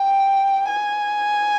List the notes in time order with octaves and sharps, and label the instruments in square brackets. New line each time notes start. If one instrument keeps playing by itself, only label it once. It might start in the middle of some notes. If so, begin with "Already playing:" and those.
Already playing: [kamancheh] G5
G#5